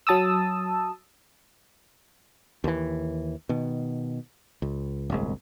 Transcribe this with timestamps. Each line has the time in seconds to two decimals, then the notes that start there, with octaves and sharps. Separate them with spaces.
0.07 F#3 A5 D#6 E6
2.64 D#2 E3
3.49 B2 D#3
4.62 C#2
5.10 D1 G1 C2 G#3